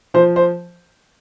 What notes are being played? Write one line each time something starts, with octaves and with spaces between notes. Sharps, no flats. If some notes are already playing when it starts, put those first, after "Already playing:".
F3 C5
C5